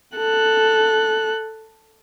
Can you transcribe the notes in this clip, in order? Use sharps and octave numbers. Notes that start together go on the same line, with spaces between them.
A4 F#6